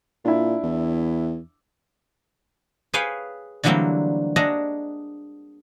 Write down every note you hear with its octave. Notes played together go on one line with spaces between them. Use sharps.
A#2 D4 E4
E2
G#4 B4 C#5 F5 G5 G#5
D3 E3 F#3 G3 A#3 C4
D4 F#4 G#4 D#5 E5 A#5